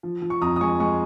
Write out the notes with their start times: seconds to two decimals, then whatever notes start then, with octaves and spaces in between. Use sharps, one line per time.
0.03 F3
0.22 F3
0.30 C#6
0.41 F2 A#5 D#6
0.56 D#6
0.60 G#3 G#5 C#6
0.80 G#3 G#5 C#6